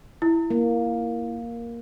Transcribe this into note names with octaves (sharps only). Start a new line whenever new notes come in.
E4
A#3